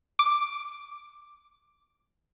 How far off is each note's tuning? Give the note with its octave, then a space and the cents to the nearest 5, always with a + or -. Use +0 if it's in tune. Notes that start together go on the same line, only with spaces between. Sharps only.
D6 +5